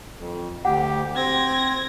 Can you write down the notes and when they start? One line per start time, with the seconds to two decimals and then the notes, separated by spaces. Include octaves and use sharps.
0.19 F2
0.65 D2 G4 F#5
1.16 C4 G#6 A#6